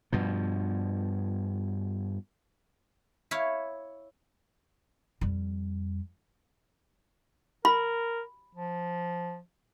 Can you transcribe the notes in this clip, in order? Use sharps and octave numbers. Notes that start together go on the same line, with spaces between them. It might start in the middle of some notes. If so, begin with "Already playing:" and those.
G2 B2 F3
E4 C#5 F5
F2 G3
A#4 B5
F3